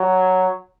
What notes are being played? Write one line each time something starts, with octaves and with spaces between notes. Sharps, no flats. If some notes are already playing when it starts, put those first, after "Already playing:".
Already playing: F#3